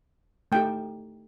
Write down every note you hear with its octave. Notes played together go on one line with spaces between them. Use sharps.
A3 D#4 G4 G5